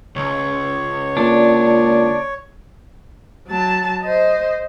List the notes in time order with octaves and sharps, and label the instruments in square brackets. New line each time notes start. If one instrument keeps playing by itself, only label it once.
[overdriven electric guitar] C#2 [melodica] C#5
[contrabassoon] A#2 [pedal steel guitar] D4
[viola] F#3 A5
C5 D#5